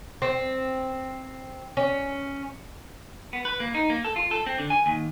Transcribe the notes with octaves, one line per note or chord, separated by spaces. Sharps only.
C4
C#4
B3
B4
A#3
D#4
A#3
A4
F4
A4
C4
D3
G#5
D#2